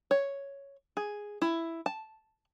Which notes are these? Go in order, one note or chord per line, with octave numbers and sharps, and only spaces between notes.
C#5
G#4
E4
A5